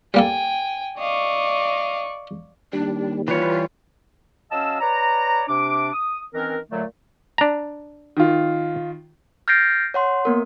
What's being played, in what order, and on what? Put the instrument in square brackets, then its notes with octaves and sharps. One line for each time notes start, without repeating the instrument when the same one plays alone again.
[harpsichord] G3 A#3 A4 [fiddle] G5 G#5
[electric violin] D5 C#6 [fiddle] D#5 F5
[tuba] D#2 [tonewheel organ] G3 [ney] D4
[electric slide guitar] E3 G3 C#5 [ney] F4 [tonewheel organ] B4
[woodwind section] F#3 C#4 D#5 F5 A5 E6
B4 C#5 D5 A#5
C3 D4 D6
D#6
D#3 E3 C4 C#4 A#4
A#2 D3 F#3 A3
[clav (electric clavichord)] D4 A#5
[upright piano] D#3 F4
[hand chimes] F6 G6 A6 A#6 C7 D7
C#5 F#5 C6
A#3 B3 A#4